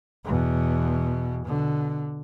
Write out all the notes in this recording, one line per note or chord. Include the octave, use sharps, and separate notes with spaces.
E2 B2
B2 D3